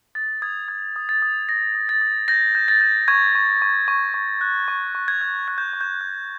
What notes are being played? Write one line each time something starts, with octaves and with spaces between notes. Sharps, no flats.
D#6 A6
D#6 G#6
D#6 G#6
D#6
A6
D#6
D#6 A#6
D#6
A6
D#6
G6 A#6
G6
A6
G6
C#6 G#6
C#6
C#6
C#6
C#6
F#6
C#6
C#6
G#6
F#6
F#6 G#6
G6
C#6
G6
F#6